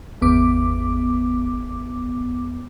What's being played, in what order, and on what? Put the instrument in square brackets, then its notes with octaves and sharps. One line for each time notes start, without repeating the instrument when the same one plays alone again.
[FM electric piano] G#1 E2 B3 D6